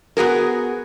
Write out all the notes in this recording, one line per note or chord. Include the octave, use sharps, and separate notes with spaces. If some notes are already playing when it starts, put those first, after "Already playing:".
B3 F#4 G#4 A#4